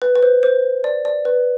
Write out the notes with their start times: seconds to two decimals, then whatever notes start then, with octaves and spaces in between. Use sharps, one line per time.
0.02 B4
0.15 B4
0.23 C5
0.43 C5
0.84 D5
1.05 D5
1.25 B4